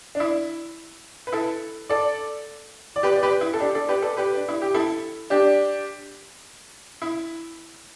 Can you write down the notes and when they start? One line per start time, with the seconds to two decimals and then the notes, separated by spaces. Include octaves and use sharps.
0.15 D4
0.20 E4
1.27 B4
1.32 E4 A4
1.89 A4 D5
2.96 D5
3.03 G4 B4
3.16 D5
3.23 G4 B4
3.41 E4
3.54 A4
3.60 D4 G4
3.75 A4 D5
3.89 G4 B4
4.02 A4 D5
4.17 G4 B4
4.36 D4
4.48 E4
4.62 G4
4.74 E4 A4
5.30 D4 G4
7.02 E4